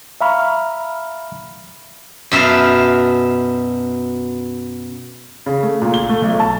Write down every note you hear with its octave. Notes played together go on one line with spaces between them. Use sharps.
E5 F5 A#5 B5 C#6 F6
F#2 B2 E5 F5 A5
C#3
A3
A#2
G7
A3
B1
A5